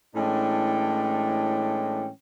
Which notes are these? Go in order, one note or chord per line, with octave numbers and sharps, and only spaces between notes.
A2 E3 G#3 C#4 D4 G5